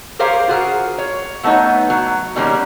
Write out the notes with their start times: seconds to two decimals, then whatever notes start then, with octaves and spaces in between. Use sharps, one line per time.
0.19 G4 G#4 A#4 C5 C#5 F5
0.48 F4 F#4 G#4 A#4
0.98 C#5
1.43 F#3 A3 B3 D4 D#4 C#5
1.90 F#3
2.36 B2 D#3 G3 G#3 A#3 C#4